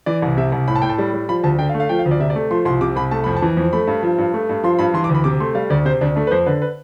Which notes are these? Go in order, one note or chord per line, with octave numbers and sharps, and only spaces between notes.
E3 D5
C2
C3 E5
C2
A2 B5
A5
A2 G5
A5
G3
G3
F3 B5
D2 A5
D3 G5
F5
A3
F5
F3 G5
F5
D2
D5
C3 E5
D5
A3
F3 C6
C2 C6
C3 D6
C2 B5
A3 A5
F2 B5
A5
E3
F2
A3 B5
G2
F3
G2
A3
G2
F3 C6
G2 B5
E3 C6
D6
D2
B5
C3 D6
A3 C6
G3 F5
D2 D5
C3 C5
D2 D4
A3 D4
B4
F2 C5
D3 B4
B4